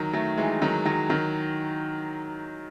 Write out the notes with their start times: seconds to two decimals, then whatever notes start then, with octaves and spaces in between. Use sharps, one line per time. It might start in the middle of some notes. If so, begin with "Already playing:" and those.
Already playing: D#3 F#3
0.13 F#3 A3
0.38 E3 G#3
0.62 D#3 F#3
0.86 D#3 F#3
1.10 D#3 F#3